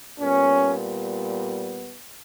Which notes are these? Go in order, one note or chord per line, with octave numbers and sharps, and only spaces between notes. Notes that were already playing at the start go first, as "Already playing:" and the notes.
A#2 G3 B3 C#4